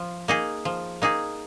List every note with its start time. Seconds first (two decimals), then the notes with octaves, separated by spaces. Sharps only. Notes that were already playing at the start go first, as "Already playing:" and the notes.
Already playing: F3
0.28 A#3 D#4 G#4
0.65 F3
1.02 A#3 D#4 G#4